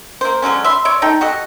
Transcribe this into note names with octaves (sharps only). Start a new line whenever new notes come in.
A#3 C5
D3 F#3 G#3 C#4
E5 B5 C6
C#5 D5 E5 C6
D4 D#4 A4 G5
F#4 G4 A4 D#5